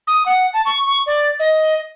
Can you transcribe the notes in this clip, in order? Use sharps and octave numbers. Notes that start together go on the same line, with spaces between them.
D#6
F#5
A5
C#6
C#6
D5
D#5